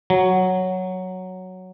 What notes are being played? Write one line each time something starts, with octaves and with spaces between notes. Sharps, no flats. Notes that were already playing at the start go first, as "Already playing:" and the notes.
F#3